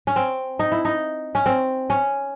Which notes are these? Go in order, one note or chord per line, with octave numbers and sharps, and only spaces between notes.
C#4
C4
D#4
E4
D#4
C#4
C4
C#4